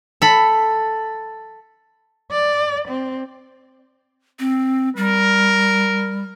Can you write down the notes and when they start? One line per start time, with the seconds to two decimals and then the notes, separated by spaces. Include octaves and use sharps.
0.22 A4 B5
2.31 D5
2.88 C4
4.39 C4
4.97 G3 A#4